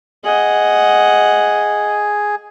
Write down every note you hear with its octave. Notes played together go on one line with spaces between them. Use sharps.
G#4 D#5 F#5